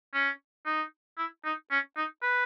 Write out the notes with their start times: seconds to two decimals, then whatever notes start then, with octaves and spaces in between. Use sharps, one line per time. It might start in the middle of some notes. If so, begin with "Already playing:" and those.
0.14 C#4
0.66 D#4
1.18 E4
1.45 D#4
1.71 C#4
1.97 D#4
2.22 B4